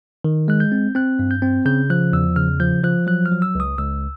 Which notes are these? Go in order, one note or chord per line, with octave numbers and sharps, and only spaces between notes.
D#3
G#3 F#6
G6
C4
C4 F#6
G2
G6
C4
C#3 G6
F3 F#6
E2 E6
C#3 F6
F3 G6
F3 F#6
F#3 F#6
F6
F#3
E6
C#2 D#6
C#2 E6